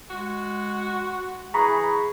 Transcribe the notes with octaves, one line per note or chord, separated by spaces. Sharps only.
G#3 F#4
E3 G#4 A#5 B5 C#6